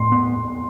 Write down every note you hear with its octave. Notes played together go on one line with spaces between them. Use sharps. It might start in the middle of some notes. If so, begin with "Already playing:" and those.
Already playing: A2 C6
B3